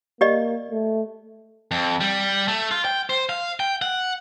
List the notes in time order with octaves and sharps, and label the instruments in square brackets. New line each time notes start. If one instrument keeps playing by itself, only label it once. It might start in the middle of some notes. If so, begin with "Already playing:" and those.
[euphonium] A#3 [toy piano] G4 D5 D#5
[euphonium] A3
[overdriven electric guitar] F2
G3
A3
F4
G5
C5
F5
G5
F#5